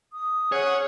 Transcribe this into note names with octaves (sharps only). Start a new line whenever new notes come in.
D#6
C#4 G#4 C#5 F#5